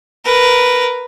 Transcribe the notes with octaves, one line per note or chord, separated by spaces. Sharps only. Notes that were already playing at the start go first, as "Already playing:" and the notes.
A#4 B4